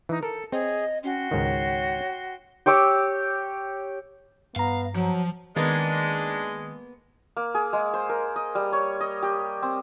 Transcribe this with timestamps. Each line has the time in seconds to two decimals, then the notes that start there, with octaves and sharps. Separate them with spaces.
0.09 E3 D#4
0.23 A4 A#4
0.52 C4 G#4 C#5 D#5
1.04 C#4 F#4 G5 C6
1.31 C#2 G#2 D#3 C#5
2.66 G4 C#5 D6 E6
4.56 G2 B3 F5 A#5
4.95 F3 F#3
5.56 D#3 G#3 A#3 B3 D4
7.37 A#3
7.55 G#4
7.73 G#3
7.94 C5
8.09 A#4
8.36 D#5
8.55 G3
8.72 C#5
9.01 D#5
9.23 G4
9.62 C4